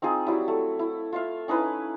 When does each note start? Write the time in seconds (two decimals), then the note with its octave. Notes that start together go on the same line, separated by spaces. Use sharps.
0.02 C4 D#4 F4 G#4
0.27 F#3 G3 E4
0.48 A3
0.79 E4
1.12 F4 E5 F5
1.48 C#4 D#4 E4 B4